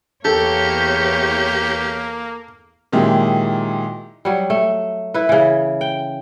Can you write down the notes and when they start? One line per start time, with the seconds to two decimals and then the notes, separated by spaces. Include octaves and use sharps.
0.25 E2 A#3 G4 A4 C#5
2.92 A#2 D#3 F#3 G#3 E4 G4
4.25 F#3 G3
4.50 A3
5.14 E4 B4
5.29 C#3 E3
5.81 G5